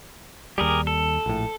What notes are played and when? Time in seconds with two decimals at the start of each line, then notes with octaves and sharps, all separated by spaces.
0.58 D#2 G3 G4 G#4 A#4
0.87 A4
1.26 A#1 A2